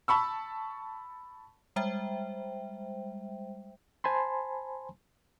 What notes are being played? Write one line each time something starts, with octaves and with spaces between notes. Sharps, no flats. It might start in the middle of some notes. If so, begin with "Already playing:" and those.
A5 B5 C#6 E6
G3 G#3 C5 E5 G5
C5 G#5 A5 B5 C6